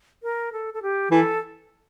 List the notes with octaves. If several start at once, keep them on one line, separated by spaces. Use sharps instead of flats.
A#4
A4
A4
G4
E3 A4